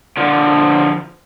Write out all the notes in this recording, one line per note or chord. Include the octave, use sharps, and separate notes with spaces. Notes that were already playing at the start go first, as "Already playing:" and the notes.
D3 F3